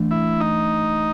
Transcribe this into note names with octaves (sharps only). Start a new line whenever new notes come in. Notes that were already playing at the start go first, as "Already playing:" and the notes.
Already playing: E3 A3 D4
E4
D#4